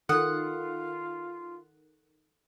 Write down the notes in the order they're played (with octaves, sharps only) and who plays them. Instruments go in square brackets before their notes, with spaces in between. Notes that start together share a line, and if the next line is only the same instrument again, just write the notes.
[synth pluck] D#3 [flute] F4 [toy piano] A4 [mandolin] F#5